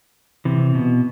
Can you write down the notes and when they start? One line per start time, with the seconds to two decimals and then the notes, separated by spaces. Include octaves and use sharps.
0.45 C3 E3
0.75 B2